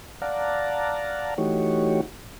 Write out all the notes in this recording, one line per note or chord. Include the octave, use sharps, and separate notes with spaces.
D5 F5 F#5 A5 A#5
E3 A3 D#4 F#4 G4 C#5